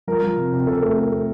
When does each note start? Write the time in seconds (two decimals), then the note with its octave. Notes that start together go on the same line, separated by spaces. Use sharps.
0.07 F3 A#4
0.23 F3
0.37 C3
0.52 C3
0.67 C3 A4
0.82 A3
0.97 A3
1.12 A3